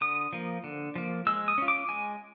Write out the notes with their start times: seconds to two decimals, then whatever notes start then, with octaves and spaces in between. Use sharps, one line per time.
0.01 D3 D#6
0.33 F3 A#3
0.64 D3
0.96 F3 A#3
1.27 G#3 E6
1.48 D#6
1.58 C#4 F4
1.68 D6
1.89 G#3 G#5